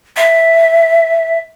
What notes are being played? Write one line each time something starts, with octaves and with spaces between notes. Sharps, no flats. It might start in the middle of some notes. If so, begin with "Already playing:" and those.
E5